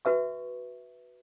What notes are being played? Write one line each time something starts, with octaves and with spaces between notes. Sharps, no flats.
F#4 B4 E5 C#6